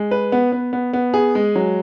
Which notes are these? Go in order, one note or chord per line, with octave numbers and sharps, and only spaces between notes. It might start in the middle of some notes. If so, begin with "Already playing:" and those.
Already playing: G#3
B4
B3
B3
B3
B3
G#4
G#3
F#3